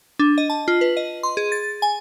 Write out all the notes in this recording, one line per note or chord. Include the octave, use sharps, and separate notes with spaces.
D4
D#5
A5
F4
B4
D#5
C6
G#4
A6
G#5